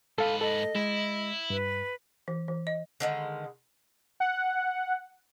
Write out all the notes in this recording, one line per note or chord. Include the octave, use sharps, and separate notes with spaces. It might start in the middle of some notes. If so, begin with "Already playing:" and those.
G#2 A4 B4 F5
A4 D#5
G#3 E4
G2 B4
E3
E3
D#5
D3 D#3 G#3
F#5